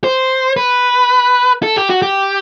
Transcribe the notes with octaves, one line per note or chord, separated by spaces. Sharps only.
C5
B4
A4
G4
F#4
G4